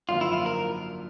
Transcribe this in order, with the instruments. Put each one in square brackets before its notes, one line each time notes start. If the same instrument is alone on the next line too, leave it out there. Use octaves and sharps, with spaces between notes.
[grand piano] G#1 F#2 D3 F3 A#3 [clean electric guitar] F4
[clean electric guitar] E4
F4
A#4